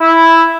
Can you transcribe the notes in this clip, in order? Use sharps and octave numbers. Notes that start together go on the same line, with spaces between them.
E4